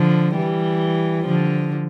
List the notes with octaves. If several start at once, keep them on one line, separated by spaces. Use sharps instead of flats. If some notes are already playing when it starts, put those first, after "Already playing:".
Already playing: D3 F3
E3 G3
D3 F3